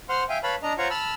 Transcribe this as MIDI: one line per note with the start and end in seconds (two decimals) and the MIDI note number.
0.09 0.24 72
0.09 0.24 78
0.09 0.24 84
0.09 0.24 89
0.29 0.38 76
0.29 0.38 77
0.29 0.38 79
0.29 0.38 80
0.43 0.55 71
0.43 0.55 73
0.43 0.55 77
0.43 0.55 81
0.43 0.55 83
0.63 0.73 62
0.63 0.73 75
0.63 0.73 82
0.78 0.88 65
0.78 0.88 72
0.78 0.88 73
0.78 0.88 78
0.78 0.88 82
0.78 0.88 85
0.90 1.14 81
0.90 1.14 83
0.90 1.14 88
0.90 1.14 89